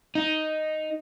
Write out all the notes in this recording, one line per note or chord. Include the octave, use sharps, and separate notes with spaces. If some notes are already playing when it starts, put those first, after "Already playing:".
D#4